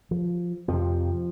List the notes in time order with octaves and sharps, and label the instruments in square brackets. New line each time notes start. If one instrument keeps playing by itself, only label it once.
[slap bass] F3
F2 C3 F3